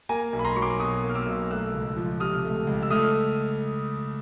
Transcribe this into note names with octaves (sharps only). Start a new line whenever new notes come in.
A#3 G#5 A#5
B1
B5
A#5 C6
F#3 C#6
C6 D6
B2 C#6 D#6
A#3
F6
D6 E6
B1
A3 E6 F#6
C#2
F3
C3 D#6 F6
A3
C#2
E6
A3 D#6 F6